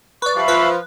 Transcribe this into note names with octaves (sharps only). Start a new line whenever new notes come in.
B4 D5 C#6
F3 G3 E5 F5 B5
F3 B4